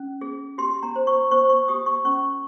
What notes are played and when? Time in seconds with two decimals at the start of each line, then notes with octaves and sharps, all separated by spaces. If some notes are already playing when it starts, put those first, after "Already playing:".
Already playing: C#4
0.21 G#4
0.58 G4 C6
0.83 A#5
0.96 C5
1.07 C#6
1.31 C5 C#6
1.50 C#6
1.68 G4 D#6
1.86 C#6
2.05 C#4 C#6